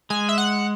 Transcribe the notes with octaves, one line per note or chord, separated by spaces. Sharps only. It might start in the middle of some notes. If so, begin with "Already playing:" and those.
G#3 G#5
E5
F#5